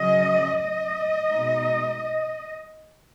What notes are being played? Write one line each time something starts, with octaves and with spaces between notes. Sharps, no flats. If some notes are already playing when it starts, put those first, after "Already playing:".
Already playing: C#3 F#3 C#4 D#5
D#5
B2 G#3 D#4